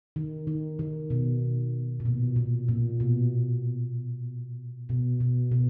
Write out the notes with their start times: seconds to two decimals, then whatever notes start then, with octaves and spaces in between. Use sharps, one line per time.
0.16 D#3
0.47 D#3
0.79 D#3
1.10 B2
2.00 A#2
2.05 B2
2.36 A#2
2.68 A#2
3.00 B2
4.89 B2
5.20 B2
5.51 B2